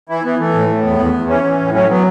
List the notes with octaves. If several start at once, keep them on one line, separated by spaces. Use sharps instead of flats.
E3 E4
E3 B3
E3 A3
A2
A2
E2 B3
E2
E2
E3 C#4
E3
A2
F#3 C#4
F#3 B3